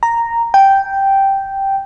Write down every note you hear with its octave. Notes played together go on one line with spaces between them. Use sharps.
A#5
G5